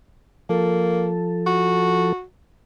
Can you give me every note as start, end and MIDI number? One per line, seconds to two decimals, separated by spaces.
0.49 2.13 53
0.49 1.11 58
0.49 2.13 69
1.46 2.24 66